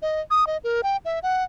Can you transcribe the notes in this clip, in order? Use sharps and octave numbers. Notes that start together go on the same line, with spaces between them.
D#5
D#6
D#5
A#4
G5
E5
F#5